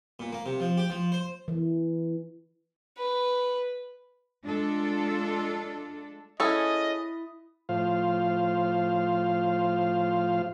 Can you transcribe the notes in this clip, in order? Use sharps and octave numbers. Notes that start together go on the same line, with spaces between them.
A#2
A#3
C3
F3
G4
F3
C5
E3
B4
G#3 D4 F4 A4
C#4 E4 G#4 A4 D#5 E5 D#6
A2 F3 F4 C5 F5